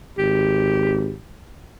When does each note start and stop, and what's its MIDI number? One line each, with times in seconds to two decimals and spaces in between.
0.19 1.15 32
0.19 1.16 67